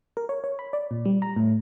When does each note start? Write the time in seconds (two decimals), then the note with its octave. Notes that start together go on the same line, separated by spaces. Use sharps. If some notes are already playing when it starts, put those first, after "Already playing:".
0.17 A#4
0.29 C#5
0.44 C#5
0.59 B5
0.73 D5
0.91 A#2
1.05 G3
1.22 A#5
1.36 A2